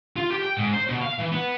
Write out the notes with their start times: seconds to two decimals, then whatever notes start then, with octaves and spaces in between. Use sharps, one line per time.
0.16 F4
0.30 G4
0.42 G5
0.57 G#2
0.73 C5
0.87 B2
1.01 F5
1.18 E3
1.32 B3